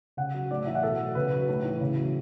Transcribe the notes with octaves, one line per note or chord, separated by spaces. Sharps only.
C#3 F#5
F#3
A2 D5
E3 E5
F#5
B2 A4
F#3
C#3 B4
F#3
A2
E3
C#3
F#3